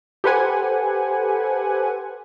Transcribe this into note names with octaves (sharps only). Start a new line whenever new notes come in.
G4 A4 B4 C5 F#5 G#5